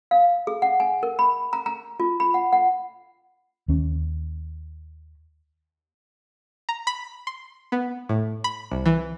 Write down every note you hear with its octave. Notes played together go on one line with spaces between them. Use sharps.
F5
G#4
F#5
G#5
A#4
B5
A#5
A#5
F4
B5
F#5
F#5
D#2 C#4
A#5
B5
C6
B3
A2
B5
C2
E3